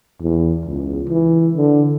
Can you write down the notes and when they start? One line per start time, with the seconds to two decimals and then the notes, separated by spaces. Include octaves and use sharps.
0.21 E2
0.65 C#2
1.09 E3
1.55 D3